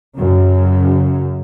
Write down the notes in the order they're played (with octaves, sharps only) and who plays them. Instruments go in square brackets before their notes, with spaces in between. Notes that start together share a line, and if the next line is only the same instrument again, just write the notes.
[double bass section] F#2 C#3